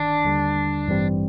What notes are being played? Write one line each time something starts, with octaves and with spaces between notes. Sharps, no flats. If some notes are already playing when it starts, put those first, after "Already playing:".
Already playing: G1 D#3 D4
D#2 D3 G3
A1 G2 E3 G3 C4